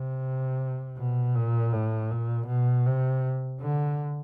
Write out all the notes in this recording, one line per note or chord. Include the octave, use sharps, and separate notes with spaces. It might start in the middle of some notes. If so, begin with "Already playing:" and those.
Already playing: C3
B2
A#2
A2
A#2
B2
C3
D3